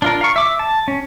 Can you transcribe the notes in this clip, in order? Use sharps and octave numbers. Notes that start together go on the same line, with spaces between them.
D4 F4 A#4
F5 C#6
E5 D6
A5
C#4